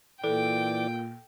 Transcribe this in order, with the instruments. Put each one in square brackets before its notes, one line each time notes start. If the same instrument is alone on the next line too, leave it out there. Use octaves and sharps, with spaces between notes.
[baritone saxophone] A#2 [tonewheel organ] E3 D5 D6 [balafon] A4 [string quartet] G5